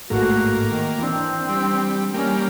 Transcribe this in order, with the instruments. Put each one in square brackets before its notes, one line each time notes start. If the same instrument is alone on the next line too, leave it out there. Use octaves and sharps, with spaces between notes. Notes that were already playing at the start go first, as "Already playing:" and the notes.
[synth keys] A1 G#2 A3 [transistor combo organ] A#3 [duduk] F#4
[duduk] D#3
[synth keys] E3 D4 [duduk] C4
[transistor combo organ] G3
[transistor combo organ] G3 A#3 [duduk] C#4